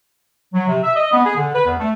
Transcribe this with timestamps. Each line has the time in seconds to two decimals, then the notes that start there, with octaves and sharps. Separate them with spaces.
0.54 F#3
0.68 C3
0.83 E5
0.96 D#5
1.13 B3
1.25 G#4
1.36 D3
1.54 B4
1.66 E2
1.78 A3